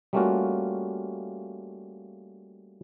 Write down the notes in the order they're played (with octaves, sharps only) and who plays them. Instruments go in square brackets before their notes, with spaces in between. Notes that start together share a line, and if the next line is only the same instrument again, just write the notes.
[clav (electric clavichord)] G3 A3 A#3 C#4 F4 F#4